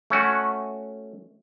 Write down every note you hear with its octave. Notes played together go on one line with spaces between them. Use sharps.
A3 C#4 F#4